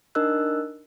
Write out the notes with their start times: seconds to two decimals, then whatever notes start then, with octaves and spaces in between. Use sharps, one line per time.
0.15 D4 D#4 A#4 D#5 E6 F#6